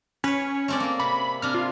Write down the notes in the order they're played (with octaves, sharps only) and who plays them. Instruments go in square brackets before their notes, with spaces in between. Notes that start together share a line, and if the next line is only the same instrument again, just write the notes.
[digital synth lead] C#4 [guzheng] B4 C#5
[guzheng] A3 C4 D5
A#3 G#4
[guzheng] C3 [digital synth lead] B5
[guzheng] C3 D4 [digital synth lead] F6
[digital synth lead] F4